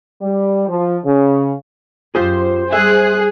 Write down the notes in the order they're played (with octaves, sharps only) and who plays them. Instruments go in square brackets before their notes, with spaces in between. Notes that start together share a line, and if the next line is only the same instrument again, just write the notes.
[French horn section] G3
F3
C#3
[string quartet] F#2 [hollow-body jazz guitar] F4 G4 G#4 [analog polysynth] C5
[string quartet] G3 F#6 [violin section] G#4 [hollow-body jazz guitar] E5